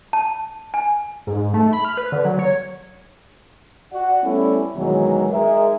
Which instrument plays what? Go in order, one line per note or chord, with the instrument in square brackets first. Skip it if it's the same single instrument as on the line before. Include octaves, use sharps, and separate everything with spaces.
[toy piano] A5
G#5
[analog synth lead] G#2
A3
B5
F6
B4
D3
F#3
C#5
[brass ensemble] F#4 D5 F#5
G3 A3 B3 C#4 E4 A4
D#2 B2 D#3 E3 F#3 G#3
G#3 D#4 G#4 A#4 E5